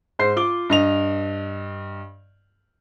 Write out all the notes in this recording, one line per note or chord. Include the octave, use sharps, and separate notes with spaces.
G#2 C5 C7
F4 D6 G7
G2 D#5 F7